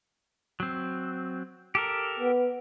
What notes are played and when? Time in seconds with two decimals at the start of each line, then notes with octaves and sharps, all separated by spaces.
0.60 F#3 C4
1.75 G4 A4 A#4
2.19 B3